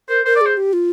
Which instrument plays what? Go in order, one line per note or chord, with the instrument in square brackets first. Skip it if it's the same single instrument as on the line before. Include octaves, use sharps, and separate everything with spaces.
[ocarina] A#4 [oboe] C5
[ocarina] A#4 [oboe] C5
[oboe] D5
[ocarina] G#4
[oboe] C5
[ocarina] G4
F4